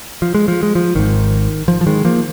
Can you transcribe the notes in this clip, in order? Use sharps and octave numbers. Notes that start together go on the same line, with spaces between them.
F3
G#3
F3
G#3
F3
G#1 G#2 D#3
F3
F3
D#3 G#3
F3 A#3